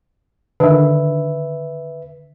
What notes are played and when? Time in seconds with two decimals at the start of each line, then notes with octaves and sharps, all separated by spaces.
0.60 D3 D#3 B4 E5